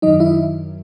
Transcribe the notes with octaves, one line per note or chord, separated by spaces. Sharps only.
F#2 D#3 F#3 D#4 D#5
E4 E5